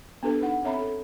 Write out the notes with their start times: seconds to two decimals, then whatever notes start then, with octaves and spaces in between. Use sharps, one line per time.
0.23 B3 D4 G4 A4 B4
0.41 D#4 F#5
0.63 C4 A4 C#5 E5 A#5 B5
0.79 A4